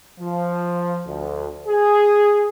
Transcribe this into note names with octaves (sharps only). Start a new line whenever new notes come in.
F3
D2
G#4